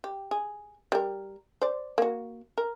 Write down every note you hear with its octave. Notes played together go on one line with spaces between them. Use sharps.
G4
G#4
G3 A#4
C5 D5
A#3 F#4
A#4